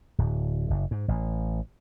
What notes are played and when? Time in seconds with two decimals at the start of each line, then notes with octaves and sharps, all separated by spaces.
0.18 D1
0.70 F#1
0.91 G#2
1.08 A1